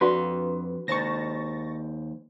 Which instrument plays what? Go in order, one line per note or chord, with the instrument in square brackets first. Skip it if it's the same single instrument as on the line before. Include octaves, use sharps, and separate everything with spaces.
[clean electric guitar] F2 C6 [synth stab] D4 F#4 B4
[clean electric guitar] D#2 C5 [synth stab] C#6 A6 A#6